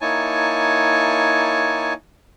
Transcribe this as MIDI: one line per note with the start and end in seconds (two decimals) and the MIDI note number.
0.01 1.93 58
0.01 1.93 63
0.01 1.93 64
0.01 1.93 73
0.01 1.93 80
0.01 1.93 81